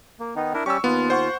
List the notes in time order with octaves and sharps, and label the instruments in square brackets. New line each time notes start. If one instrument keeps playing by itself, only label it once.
[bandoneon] A#3
D#3 B3 D#4
D4 E4 A#4
[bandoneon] G3 C#4 G4 [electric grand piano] C#6 E6
[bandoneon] D#2 F4 [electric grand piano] B3
[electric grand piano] C5 F#5 C#6